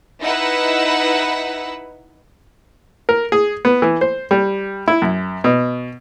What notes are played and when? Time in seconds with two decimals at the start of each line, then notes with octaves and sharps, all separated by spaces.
0.22 D#4 E4 B4 F#5 E6
3.09 A#4
3.32 G#4
3.65 B3
3.82 E3
4.01 C5
4.31 G3
4.88 E4
5.02 F#2
5.44 B2